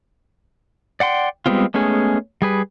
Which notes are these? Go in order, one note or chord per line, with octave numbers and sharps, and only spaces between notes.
D5 F#5 G5 C6
G3 G#3 B3 C4 F4
G#3 A3 B3 C#4 G#4
G3 G#4 B4